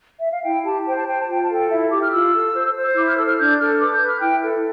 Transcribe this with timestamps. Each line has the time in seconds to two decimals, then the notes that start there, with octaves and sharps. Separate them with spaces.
0.20 E5
0.31 F5
0.43 E4 G5
0.64 G4 A5
0.85 C5 G5
0.96 A5
1.07 C5 G5
1.19 A5
1.28 F4 G5
1.42 A5
1.49 A4 G5
1.69 E4 E5
1.80 E5
1.90 G4 D6
2.01 F6
2.11 F4 E6
2.33 A4
2.53 C5
2.74 C5
2.95 E4 D6
3.06 F6
3.17 A4 E6
3.27 F6
3.37 D4 G6
3.59 A4 F6
3.80 B4 D6
3.94 G6
4.00 B4
4.08 F6
4.21 E4 G5
4.43 A4